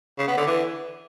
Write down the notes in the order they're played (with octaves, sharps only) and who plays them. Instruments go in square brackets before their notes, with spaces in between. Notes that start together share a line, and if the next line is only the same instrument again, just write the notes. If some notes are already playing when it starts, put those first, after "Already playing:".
[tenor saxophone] C#3
B3
D3
E3